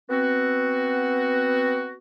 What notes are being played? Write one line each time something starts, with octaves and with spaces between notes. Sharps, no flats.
B3 C4 F#4